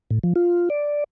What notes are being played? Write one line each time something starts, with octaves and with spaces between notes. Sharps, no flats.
A2
F3
F4
D5